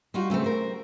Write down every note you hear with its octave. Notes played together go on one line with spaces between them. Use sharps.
G3 D#4 F4 F#4
C#3 A3 B3 C4
A#4 C5